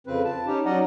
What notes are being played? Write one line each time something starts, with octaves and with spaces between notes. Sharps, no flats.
F2 C#3 C4 B4
A5
C#4 D#4 G4
F#3 C#4 D#4 D5 D#5 F#5